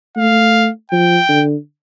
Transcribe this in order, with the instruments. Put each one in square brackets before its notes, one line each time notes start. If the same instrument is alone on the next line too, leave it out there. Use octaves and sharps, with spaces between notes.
[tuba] A3 [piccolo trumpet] F5
[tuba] F3 [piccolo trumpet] G5
[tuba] D3